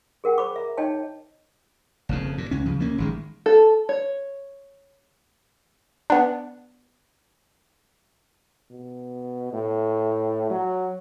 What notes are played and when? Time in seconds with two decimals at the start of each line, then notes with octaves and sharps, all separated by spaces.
0.24 G#4 A#4 F#5 G5
0.38 C5 B5 D6
0.56 E5 A#5
0.77 D#4 C#5 D#5 G5 A5
2.09 F#1 F2 C#3
2.38 A#2
2.51 C#2 C#4
2.66 C#3 F3
2.79 D2 A#3 C#4
2.98 A1 D#3 G#3
3.46 A4
3.89 C#5
6.10 B3 D4
8.71 B2
9.53 A2
10.50 F#3